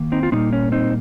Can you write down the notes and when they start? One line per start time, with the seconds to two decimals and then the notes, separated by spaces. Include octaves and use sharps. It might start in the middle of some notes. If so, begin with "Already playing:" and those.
Already playing: D#3 A#3
0.12 C4 D#4
0.23 F4
0.32 A#2 G3 A#3 C4 D#4
0.53 C#4
0.72 C4 D#4